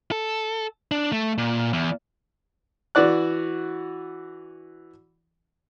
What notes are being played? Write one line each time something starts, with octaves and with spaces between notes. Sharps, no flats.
A4
D4
A3
A#2
E2
E3 F#4 D5 F#6